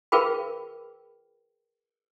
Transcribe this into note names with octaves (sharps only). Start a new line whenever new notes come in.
F4 G#4 A#4 B4 G5 B5